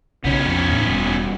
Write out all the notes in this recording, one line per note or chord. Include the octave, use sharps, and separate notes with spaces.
B1 C#3 B3 C#4
F2
E2 A2
E1 G3